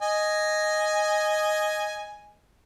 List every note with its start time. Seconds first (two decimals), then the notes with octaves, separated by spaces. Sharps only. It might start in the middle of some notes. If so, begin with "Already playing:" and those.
0.02 D#5 G#5